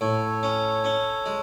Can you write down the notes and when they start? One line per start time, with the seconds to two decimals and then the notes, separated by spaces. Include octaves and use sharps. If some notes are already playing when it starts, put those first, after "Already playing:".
0.01 A2 A4 C#5
0.43 C#4
0.84 C#4
1.26 G#3